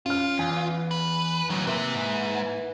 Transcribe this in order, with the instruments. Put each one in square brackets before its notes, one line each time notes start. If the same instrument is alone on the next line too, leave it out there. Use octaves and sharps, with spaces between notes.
[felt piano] C#4 F6 [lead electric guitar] F4
[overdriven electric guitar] E2 [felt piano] G#5
[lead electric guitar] B4
[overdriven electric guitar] D2 F#3 [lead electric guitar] D#3 E3
[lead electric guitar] C3 [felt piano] A#3 [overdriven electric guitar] B4 E5
[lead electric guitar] G#2